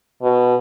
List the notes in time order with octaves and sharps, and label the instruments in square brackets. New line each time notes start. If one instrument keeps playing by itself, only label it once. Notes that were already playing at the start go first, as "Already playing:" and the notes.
[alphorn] B2